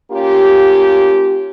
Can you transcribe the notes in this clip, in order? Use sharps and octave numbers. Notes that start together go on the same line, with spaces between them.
A#3 C#4 F4 G4